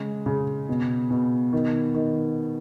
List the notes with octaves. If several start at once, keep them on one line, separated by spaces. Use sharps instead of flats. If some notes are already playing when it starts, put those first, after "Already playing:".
Already playing: C#3 G#3
C#3
B2
B2
D#3
D#3